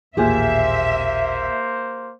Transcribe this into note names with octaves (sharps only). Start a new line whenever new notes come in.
A1 D#2 A#2 A#3 G4 G#4 C5 E5